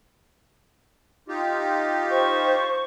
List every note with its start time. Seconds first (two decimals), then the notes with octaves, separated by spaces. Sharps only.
1.28 D#4 F4 G4
2.08 C5 C#6